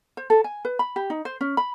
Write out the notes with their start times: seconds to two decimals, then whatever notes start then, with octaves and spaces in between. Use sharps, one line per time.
0.17 C5
0.30 A4
0.44 G#5
0.65 B4
0.79 B5
0.96 G4
1.10 D#4
1.25 C5
1.41 C#4
1.57 B5